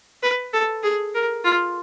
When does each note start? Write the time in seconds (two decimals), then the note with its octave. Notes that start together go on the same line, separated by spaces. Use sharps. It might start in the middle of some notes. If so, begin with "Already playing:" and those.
0.22 B4
0.53 A4
0.83 G#4
1.14 A#4
1.44 F4